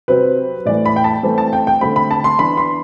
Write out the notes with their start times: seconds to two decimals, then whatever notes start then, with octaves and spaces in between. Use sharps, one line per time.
0.08 C3 F#3 C4 B4
0.65 A2 E3 A3 D5
0.86 B5
0.96 G5
1.04 A5
1.23 E3 A3 C4
1.38 A5
1.53 G5
1.67 G5
1.81 D3 A3 C4 B5
1.96 B5
2.11 A5
2.24 C6
2.38 E3 B3 D4 B5
2.57 C6